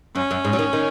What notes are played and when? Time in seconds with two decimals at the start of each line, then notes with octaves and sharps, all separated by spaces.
0.15 F#2 C#4
0.31 F#2
0.45 G#2
0.53 F#3
0.59 D#3
0.73 D#3